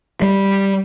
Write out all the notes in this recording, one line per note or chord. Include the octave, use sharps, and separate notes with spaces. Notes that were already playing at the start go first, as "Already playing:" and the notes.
G3